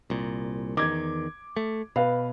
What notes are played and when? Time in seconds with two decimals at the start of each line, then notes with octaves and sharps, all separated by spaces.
0.10 C2 A#2
0.77 E2 D#3 D6 G#6
1.57 A3
1.96 B2 B4 F5